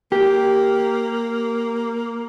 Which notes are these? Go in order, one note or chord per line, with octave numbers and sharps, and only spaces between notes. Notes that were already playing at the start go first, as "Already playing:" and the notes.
A#3 G4